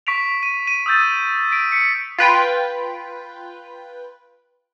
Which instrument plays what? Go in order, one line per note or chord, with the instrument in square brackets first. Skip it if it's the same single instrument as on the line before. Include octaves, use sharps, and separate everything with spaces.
[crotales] C#6 B6 D7 F7
D#7
D#7
D#6 E6 G6 A6
B6 D7
B6 C#7
[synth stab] F4 B4 G5